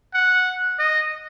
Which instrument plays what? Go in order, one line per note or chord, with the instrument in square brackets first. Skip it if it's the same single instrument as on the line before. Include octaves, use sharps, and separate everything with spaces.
[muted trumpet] F#5
D#5